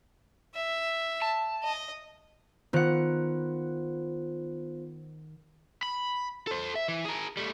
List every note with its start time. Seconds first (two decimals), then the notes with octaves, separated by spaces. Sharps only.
0.54 E5
1.22 A5
1.63 D#5
2.73 D#3 B3 F4 C5 F#5
5.83 B5
6.47 A4 C5
6.75 E5
6.88 E3
7.05 G#4 A#4
7.37 G3 A3